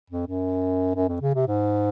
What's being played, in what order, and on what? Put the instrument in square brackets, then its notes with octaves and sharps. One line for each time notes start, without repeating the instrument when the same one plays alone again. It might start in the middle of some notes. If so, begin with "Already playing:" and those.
[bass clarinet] F2
F#2
F#2
F2
C#3
C3
G#2